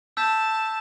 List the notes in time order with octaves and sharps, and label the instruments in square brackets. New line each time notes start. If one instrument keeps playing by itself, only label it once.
[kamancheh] A5 [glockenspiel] E6 G6 B6